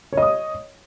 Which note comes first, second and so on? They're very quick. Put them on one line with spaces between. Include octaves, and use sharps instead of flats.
C#5 D#5 D#6